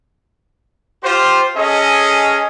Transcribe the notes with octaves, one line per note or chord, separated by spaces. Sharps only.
F4 G4 C5
C#4 G#4 A4 D#5